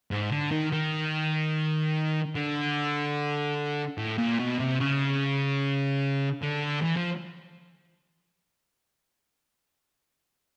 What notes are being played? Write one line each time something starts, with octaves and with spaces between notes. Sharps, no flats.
G#2
D3
D#3
D#3
D3
A2
A#2
B2
C3
C#3
D3
E3
F3